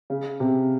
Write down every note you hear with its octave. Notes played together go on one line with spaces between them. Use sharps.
C#3
C3